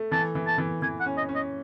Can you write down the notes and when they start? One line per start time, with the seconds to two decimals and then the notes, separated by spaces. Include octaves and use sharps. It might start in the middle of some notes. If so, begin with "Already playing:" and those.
Already playing: A3
0.12 E3 A5
0.35 E3
0.47 A5
0.58 E3
0.82 E3 G#5
1.00 F#5
1.06 C#4
1.17 D#5
1.29 C#4
1.35 D#5